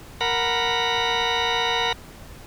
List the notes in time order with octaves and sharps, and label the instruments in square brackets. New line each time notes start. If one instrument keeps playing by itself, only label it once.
[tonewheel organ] A#4 F#5 A#5 B5